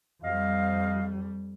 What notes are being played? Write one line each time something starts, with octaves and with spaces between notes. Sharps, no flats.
F2 G3 C5 D#5 F5